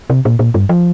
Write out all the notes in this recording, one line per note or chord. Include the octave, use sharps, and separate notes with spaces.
C3
A#2
A#2
G2
F3